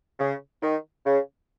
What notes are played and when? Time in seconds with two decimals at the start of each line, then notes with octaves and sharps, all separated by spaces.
0.20 C#3
0.63 D#3
1.06 C#3